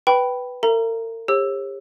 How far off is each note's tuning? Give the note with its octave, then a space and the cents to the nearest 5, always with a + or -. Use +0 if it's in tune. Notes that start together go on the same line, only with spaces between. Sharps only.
B4 +0 G5 -10 B5 +0
A#4 -45 E5 +40 A#5 +0
G4 +40 C#5 -40 E6 +0